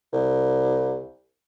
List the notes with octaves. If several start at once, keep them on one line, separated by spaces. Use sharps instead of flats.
C2